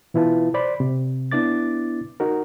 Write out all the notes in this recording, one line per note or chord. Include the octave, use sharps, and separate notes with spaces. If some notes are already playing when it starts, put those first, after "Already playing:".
B2 E3 E4 F4 B4 A5
C5 D5 B5
C3
B3 D4 E4 D6 A6
D#4 F#4 A#4